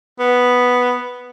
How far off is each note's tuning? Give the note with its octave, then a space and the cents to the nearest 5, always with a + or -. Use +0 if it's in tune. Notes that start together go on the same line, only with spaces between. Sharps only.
B3 +0